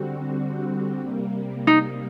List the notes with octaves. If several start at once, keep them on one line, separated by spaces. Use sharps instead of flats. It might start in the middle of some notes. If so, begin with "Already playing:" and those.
Already playing: D3 G3 C4 F#4
C3 G3 A#3
D#4